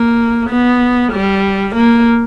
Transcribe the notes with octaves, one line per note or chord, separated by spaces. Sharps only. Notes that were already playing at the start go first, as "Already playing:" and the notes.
Already playing: A#3
B3
G3
A#3